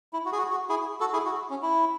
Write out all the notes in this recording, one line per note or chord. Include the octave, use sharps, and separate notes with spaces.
E4
F#4
G#4
F#4
F#4
E4 G#4
F#4 A4
E4 G#4
F#4
C#4
E4